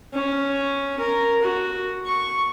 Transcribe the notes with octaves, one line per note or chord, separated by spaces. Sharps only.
C#4
A#4
F#4
C#6